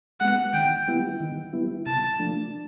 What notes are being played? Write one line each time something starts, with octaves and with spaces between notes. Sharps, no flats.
G#3 B3 F#5
D#3 G5
G3 B3 E4
D#3
G3 B3 E4
C3 A5
F3 A3 D4